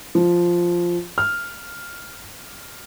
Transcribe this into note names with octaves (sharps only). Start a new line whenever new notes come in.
F3
F6